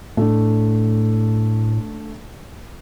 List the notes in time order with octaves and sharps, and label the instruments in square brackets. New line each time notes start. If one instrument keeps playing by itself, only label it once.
[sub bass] A2 [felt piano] A3 D4